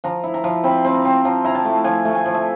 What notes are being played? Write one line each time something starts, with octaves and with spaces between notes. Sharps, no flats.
F3 A#5
E4
A#5
F3
C4 B5
C4
A#5
C4
F3 A#5
E4 A#5
A5
A3
F3 G#5
A3
G#5
F3
E5